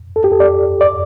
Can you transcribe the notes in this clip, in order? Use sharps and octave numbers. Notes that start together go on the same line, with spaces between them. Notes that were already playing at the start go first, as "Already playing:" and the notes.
A4
G4
A4
D5
D5